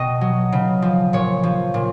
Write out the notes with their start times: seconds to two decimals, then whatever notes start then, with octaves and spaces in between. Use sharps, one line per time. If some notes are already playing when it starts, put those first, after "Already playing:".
Already playing: B2 D#5 G5
0.21 F#3
0.52 C#3
0.82 F3
1.13 A#2 C#5
1.43 F3
1.74 A#2